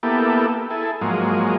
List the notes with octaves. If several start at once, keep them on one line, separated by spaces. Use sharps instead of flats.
A#3 B3 E4 G4 A4
E4 G#4 A4
G#2 F3 F#3 G#3 A#3